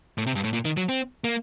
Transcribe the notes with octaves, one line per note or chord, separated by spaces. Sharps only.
A2
C3
G2
A2
A#2
D#3
F#3
C4
A#3